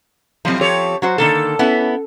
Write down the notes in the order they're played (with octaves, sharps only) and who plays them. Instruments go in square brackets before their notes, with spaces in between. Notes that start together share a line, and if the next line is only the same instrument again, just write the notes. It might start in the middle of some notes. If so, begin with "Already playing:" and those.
[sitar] A2 F#3 [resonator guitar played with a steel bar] F3 C4
[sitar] G4 A4 C#5
[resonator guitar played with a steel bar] F#3 F#4 C5
[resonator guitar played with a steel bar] D3 D#3 A#3 [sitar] A4
[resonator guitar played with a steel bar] B3 E4 [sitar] C#4